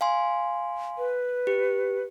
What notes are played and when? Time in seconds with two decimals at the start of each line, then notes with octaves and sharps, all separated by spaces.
0.01 F5 G#5 C6
0.98 B4
1.47 G4